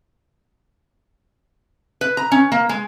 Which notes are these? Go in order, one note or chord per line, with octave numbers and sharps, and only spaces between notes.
B4
A#5
C#4
A#3
G#3